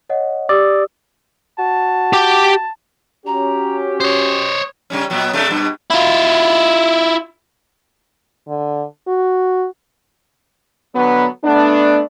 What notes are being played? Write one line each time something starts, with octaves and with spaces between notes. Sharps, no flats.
C#5 D#5 F#5
G4 D5 D#6 E6
F#4 A5
G4 G5
C#4 F#4 G4 A#5
C5 C#5 D#6
C#3 G3 C#4
A#2 F#3 B3
C3 A3 D4
G2 B2
E4 F4
D3
F#4
D3 F#3 B3
A3 B3 D4